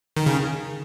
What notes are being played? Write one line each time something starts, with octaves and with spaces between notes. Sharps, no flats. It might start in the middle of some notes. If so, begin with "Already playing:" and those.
D#3
C#3